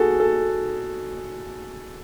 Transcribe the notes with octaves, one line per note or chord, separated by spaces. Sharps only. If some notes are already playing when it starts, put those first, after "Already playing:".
Already playing: F#4 G#4 A4
A4